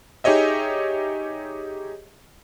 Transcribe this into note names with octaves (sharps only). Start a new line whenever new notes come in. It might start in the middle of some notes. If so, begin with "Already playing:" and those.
D#4 G4 G#4 C#5 D#5 E5